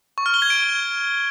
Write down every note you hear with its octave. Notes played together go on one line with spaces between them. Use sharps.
C#6
F6
G7
G#6
D7